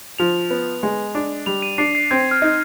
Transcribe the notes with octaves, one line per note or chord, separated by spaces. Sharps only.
F3 F7
B3
G#3
D4
G3 F7
D#7
D4 C7
C7
C4 G#6
F6
D#4